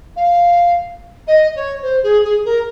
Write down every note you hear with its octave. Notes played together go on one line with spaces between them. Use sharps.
F5
D#5
C#5
C5
G#4
G#4
A#4